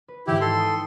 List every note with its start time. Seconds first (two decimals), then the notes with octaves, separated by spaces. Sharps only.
0.08 B4
0.27 G#2 D#3 E3 E4 G4
0.41 A4 C6
0.57 G5 D#6